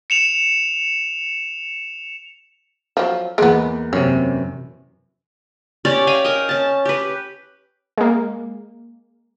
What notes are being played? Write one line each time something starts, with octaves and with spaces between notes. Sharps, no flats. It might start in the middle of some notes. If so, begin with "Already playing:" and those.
C#7 E7 F7
F3 F#3
E2 G#3 A#3 B3
F#2 C3 C#4
C#4 G4 C#5 D5
F5 G5 G#5
A#4 D#5
C#4 A5
G4 B4
G#3 A#3